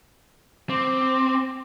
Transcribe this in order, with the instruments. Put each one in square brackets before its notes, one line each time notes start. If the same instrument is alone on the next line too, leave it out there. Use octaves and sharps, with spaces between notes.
[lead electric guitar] C4 [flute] D6